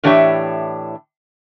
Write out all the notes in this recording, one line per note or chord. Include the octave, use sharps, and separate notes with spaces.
A2 E3 D4 G4 C#5 E5